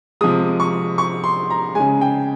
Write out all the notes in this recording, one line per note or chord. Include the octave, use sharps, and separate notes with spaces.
C3 F3 G#3 D#6
C#6
C#6
C6
A#5
C#3 G#3 G#5
G5